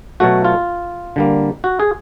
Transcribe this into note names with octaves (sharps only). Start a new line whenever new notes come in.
B2 F#3 A3 F#4
F4
D3 G3 A#3
F#4
G#4